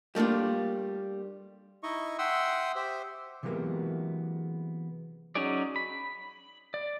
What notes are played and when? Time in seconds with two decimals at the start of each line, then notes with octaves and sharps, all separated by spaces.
0.15 G3 A3 A#3 D4 F4
1.83 D#4 E4 D#5 C#6
2.18 E5 F#5 G5 C6 D#6 E6
2.75 G4 C5 E5
3.43 C3 E3 F#3 G#3 A#3 B3
5.35 F#3 C#4 D#4 G#4 D5
5.76 B5
6.74 D5